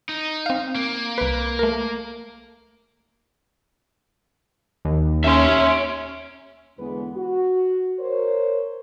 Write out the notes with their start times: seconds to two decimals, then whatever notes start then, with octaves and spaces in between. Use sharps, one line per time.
0.09 D#4
0.46 C4 F5
0.75 A#3
1.18 C2 B4
1.59 A3 A#4
4.85 D#2
5.24 C#4 C#5 E5 C6
6.79 E2 D3 E3 G#3 B3 B4
7.16 F#4
7.99 A#4 C5 C#5